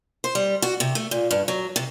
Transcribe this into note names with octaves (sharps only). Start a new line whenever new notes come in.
C5
G3
F#4
C3
A3
A#2
G2
F#3
C3